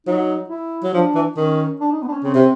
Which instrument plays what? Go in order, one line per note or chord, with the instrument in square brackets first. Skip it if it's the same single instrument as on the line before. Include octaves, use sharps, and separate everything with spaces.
[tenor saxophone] F#3 [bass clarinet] D#4
[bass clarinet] E4
[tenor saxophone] F#3
[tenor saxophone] F3 [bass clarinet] D4
[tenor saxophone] E3
[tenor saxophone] D#3 [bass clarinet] C#4
[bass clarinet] D4
D#4
B3
D4
C#4
[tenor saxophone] C#3 [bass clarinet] C4
[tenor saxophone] C3